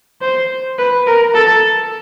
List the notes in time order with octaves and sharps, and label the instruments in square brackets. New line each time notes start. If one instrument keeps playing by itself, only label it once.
[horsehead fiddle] C5
B4
A#4
A4